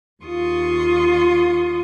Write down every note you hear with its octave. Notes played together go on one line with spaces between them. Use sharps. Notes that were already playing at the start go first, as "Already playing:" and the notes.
D#2 F4 C6 C#6 D#6